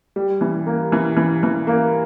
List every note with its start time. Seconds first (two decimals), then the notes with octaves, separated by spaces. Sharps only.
0.16 G3
0.41 E3
0.67 A#3
0.92 E3
1.17 E3
1.43 E3
1.67 A#3